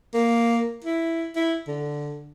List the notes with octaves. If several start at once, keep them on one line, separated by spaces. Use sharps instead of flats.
A#3
E4
E4
D3